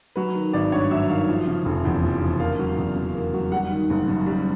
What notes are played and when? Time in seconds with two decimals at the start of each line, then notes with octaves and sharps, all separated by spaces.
0.16 F#3 B4
0.35 D#3
0.53 G#1 D5
0.72 G2 C#5
0.91 F#3 E5
1.10 D#3 F5
1.29 F3
1.47 C#3
1.65 F1
1.85 E2
2.03 F3
2.22 C#3
2.40 A#3 F5
2.59 F#3
2.77 E2
2.96 C#3
3.15 A#3
3.33 F#3
3.52 G3 F#5
3.70 D#3
3.90 F#1
4.08 F#2
4.26 G3